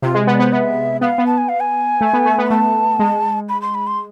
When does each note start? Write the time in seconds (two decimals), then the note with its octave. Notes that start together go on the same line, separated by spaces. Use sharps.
0.02 C3 F4
0.15 G#3
0.27 B3 B4
0.34 D5
0.40 B3 C5
0.52 B3 E5
1.01 B3 F5
1.18 B3
1.27 A5
1.38 G#5
1.49 F5
1.60 G#5
2.01 A3
2.13 B3
2.25 A3
2.38 B3
2.46 B5
2.50 A3 A5
2.99 G#3
3.49 B5
3.62 C6
3.75 B5
3.87 C6